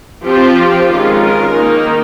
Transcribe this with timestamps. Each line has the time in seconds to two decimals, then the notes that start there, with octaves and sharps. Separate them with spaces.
0.22 F3 C4 F4 G4
0.88 D#3 G#3 C#4 F4
1.20 A#4
1.52 D#3 A#3 D#4